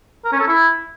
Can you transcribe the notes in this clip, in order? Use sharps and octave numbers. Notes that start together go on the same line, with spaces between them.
A#4
C#4
A4
E4